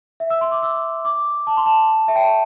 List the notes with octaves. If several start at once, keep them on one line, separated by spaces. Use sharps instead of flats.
E5
E6
C6
D6
E6
D6
A5
C6
A5
E5
G5
A5